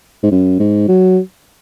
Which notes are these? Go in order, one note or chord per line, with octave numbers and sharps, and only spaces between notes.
G#2
F#2
G#2
F#3